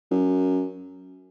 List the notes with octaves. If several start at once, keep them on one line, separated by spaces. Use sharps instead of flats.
F#2